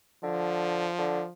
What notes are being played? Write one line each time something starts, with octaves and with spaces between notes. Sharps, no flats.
D3 F3
D3